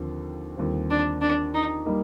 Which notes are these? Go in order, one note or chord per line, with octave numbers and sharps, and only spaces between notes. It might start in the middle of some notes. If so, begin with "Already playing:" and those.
Already playing: D#2 D3 F3 C4
D#2 D3 G3 C4 F4
D4
D4
D#4
G3 A#3 D#4